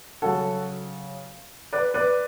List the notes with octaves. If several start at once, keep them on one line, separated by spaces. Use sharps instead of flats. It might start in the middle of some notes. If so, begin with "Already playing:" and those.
C#3 F#3 F#4 A4
B4 D5
B4 D5